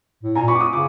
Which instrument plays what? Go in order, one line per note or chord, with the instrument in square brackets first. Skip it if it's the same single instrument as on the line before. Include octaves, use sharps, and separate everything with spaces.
[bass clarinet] A2
[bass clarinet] A#2 [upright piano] G#5 A#5
[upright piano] B5 C#6
D6
C#6 D#6
[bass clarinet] C#3 [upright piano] D6